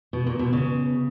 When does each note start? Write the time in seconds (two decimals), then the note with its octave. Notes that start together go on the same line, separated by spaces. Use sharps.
0.13 B2
0.27 A#2
0.39 B2
0.53 C#3